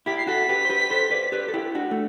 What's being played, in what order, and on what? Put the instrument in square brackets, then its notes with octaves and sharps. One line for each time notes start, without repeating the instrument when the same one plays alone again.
[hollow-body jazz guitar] E4 G4 [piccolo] B6
[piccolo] C7
[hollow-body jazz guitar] F#4 A4 [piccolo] B6
[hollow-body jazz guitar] G4 B4
C5
G4 B4
A4 C5
B4 D5
G4 B4
A4
E4 G4
D4 F#4
A3